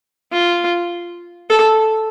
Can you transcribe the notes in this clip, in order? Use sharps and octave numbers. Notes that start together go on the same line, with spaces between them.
F4
A4